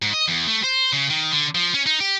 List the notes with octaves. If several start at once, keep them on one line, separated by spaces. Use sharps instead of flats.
G#2
D#5
E2
A3
C5
C#3
D#3
D3
F3
C#4
D#4
G4